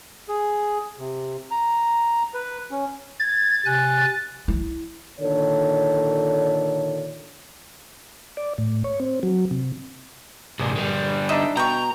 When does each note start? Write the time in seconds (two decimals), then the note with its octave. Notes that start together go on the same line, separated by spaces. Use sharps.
0.28 G#4
0.99 C3
1.51 A#5
2.34 B4
2.71 C#4
3.20 G#6 A6
3.66 C3 G#5 F#6
4.48 E4
5.21 A#2 D3 D#3 A4 C#5
8.37 D5
8.58 A2
8.84 C#5
9.00 C4
9.23 F#3
9.51 C3
10.59 A#1 G#2 C3
10.75 D3 G3
11.29 D4 D#4 D#5 E5
11.57 B2 G5 A#5 C#6